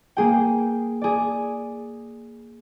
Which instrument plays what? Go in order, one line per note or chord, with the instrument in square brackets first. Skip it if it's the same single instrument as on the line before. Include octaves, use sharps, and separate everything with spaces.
[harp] A#3 G#4 G5
G#4 D5